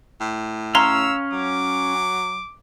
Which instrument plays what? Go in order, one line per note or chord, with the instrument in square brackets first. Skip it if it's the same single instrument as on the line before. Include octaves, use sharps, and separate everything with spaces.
[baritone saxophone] A2
[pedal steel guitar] C#4 F5 [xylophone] A#5 C6 [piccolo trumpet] E6
[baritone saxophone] F#3 [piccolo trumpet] D6